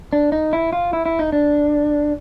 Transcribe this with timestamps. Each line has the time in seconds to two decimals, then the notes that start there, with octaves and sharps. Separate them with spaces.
0.13 D4
0.32 D#4
0.53 E4
0.73 F4
0.93 E4
1.06 E4
1.19 D#4
1.32 D4